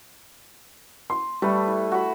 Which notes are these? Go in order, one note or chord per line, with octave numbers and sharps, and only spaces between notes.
C6
G3 A3 A4 B4
E4
F#4 B5